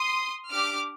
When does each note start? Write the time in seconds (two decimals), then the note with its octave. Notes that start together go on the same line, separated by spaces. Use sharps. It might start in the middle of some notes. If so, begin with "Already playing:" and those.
Already playing: C6 D#6
0.52 D4 G4 D6 F6